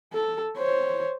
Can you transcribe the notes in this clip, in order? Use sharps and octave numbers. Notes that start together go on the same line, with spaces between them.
A4
C5 C#5